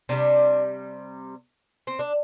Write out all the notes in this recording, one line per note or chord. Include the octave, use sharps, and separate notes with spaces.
C3 G3 D4
C4
D4